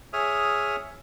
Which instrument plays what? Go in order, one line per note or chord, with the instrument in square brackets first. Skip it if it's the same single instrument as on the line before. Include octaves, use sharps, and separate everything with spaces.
[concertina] G#4 C#5 E5 D#6 F6